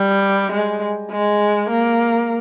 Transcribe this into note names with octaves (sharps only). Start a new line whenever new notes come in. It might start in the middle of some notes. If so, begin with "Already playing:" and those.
Already playing: G3
G#3
G#3
A#3